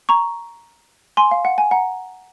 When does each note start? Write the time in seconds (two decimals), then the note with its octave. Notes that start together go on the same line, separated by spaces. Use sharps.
0.09 A#5 C#6
1.17 G#5 C6
1.31 F5
1.45 F#5
1.58 G#5
1.71 F#5 A#5